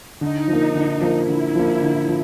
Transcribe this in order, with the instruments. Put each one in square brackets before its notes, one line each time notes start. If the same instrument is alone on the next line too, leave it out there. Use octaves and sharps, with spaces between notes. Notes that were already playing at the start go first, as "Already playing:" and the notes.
[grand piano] D3 [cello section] D#4
[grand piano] F3
A#3
D3
F3 A#3
[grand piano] D3 [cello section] E4
[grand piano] F3 A#3
D3
F3